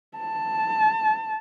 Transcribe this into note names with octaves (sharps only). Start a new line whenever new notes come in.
A5